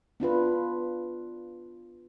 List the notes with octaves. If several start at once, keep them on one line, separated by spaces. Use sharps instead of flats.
B3 D4 F4 B4